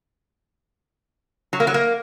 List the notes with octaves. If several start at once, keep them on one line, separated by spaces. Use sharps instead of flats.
F#3
A#3
F#3
A#3